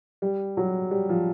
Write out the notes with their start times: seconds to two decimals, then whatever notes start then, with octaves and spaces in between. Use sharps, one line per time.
0.22 G3
0.57 F#3
0.91 G3
1.09 F3